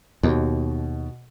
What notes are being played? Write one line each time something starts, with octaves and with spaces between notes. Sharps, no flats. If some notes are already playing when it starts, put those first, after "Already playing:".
D#2 B2